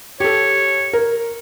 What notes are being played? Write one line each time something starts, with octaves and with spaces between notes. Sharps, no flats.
G4 A4 C#5
A#4